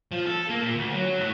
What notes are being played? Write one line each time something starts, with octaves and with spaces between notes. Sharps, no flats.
F3
A4
A#3
A#2
D2
F#3
A2